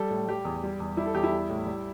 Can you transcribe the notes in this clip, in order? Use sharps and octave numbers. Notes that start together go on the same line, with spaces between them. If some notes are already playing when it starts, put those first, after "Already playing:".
Already playing: G3 A4
A2
G3 G4
E2
G3
E2
G3 E4
A4
E2 G4
E4
G3
A2
G3